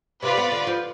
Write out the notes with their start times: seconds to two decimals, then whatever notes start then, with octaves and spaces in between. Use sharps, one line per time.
0.22 C3 F4 B4 D5
0.37 B3
0.52 D3
0.67 F3